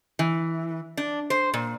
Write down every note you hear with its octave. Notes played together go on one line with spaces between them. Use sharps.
E3
D4
C5
A#2